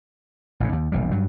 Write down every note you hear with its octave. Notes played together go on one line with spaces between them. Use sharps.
A1 A2 C#3
D#2
E1 A#1 C3 G3
G2 F#3